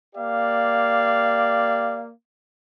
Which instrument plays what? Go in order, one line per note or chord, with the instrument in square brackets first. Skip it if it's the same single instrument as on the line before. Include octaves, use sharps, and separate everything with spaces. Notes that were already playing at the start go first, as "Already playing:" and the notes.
[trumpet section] A#3 G4 D5 F5